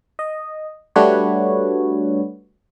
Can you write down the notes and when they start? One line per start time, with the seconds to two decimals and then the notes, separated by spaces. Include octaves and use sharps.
0.19 D#5
0.96 G3 A3 D4 F#4 B4 C#5